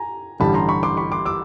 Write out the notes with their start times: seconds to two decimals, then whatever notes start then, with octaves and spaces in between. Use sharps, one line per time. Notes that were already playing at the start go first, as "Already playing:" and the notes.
Already playing: G#5 A#5
0.40 A1 G2 D3 G3 A5 B5
0.54 A#5 C6
0.69 B5 C#6
0.83 C6 D6
0.97 B5 C#6
1.12 C6 D6
1.25 D6 E6